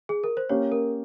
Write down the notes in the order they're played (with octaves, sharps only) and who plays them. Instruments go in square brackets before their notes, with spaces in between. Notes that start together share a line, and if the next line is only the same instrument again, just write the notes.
[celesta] G#4
A#4
C5
[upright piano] A#3 C#4 G4 [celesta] C#5
[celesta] A#4